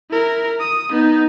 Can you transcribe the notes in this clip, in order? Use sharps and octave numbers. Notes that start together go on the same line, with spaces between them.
E4 A#4
D#6
B3 D#4